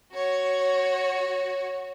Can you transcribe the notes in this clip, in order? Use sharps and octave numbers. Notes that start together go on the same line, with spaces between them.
F#4 C#5